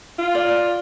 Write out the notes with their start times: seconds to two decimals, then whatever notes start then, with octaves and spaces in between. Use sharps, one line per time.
0.19 F4
0.35 D5